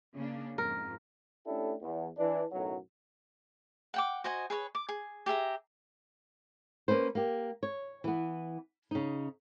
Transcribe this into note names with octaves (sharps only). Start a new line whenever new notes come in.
C#3 A#3 D4
F2 G#2 A#4
A3 C#4 D4 E4 G4 A4
E2
E3 D4
B1 F#2 A2 F#3
F#5 G5 D6
F#4 C5 D#5 G#5
G#4 B4 C#5
D6
G#4
G4 G#4 E5 A#5
A#3 C#4 B4 C5
A#3 G4
C#5
E3 B3
C#3 D#4